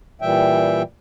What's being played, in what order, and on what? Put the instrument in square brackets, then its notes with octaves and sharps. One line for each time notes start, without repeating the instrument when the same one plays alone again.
[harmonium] A#2 E3 G3 E5 G5